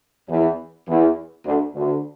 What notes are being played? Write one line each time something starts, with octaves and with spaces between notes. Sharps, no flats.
E2 E3
E2 E3
D2 D3
D2 D3